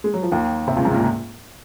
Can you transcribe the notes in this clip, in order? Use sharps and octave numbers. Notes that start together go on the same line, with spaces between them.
G#3
F#3
F3
D#2 D#3
C3
C#2 C#3
G#2 G#3
A#2 A#3